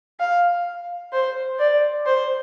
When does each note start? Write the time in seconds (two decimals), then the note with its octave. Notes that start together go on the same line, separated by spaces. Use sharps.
0.20 F5
1.13 C5
1.59 D5
2.06 C5